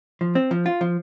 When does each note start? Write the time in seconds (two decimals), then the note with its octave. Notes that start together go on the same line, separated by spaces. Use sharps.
0.21 F3
0.35 C4
0.51 F3
0.66 F4
0.81 F3